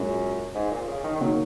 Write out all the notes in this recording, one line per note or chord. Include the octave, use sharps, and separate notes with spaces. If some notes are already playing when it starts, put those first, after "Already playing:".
Already playing: F#2 A#2 G#3 C#4
G#2
A#2
C#3
D#3
D#3
C#3 F#3 A#3 D#4